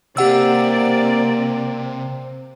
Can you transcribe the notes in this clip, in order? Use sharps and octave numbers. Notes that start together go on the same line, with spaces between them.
C3 A#3 C4 G4 D5 F#5 E6